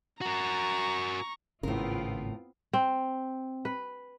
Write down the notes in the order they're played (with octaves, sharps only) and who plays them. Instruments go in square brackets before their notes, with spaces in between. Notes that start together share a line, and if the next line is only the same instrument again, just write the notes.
[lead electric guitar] F#4 A#4 [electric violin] A#5 C#6
[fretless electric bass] G#1 C#3 [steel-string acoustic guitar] A2 A#4 [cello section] B3 C4 F4
[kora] C4
B4